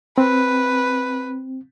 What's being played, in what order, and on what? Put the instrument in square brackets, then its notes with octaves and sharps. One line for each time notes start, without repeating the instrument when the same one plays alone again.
[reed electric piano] C4 [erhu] B4